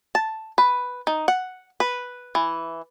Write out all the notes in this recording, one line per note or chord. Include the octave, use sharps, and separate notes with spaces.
A5
B4
D#4
F#5
B4
E3